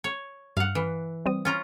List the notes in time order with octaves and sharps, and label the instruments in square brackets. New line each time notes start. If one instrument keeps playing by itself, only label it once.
[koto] C#5
[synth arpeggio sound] G2 [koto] F5 F#5
[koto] E3
[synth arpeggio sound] G3 C4 D#6
[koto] C#4 F4 A#5